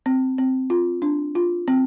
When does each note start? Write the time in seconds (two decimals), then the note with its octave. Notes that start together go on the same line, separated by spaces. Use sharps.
0.06 C4
0.38 C4
0.70 F4
1.02 D4
1.35 F4
1.68 C4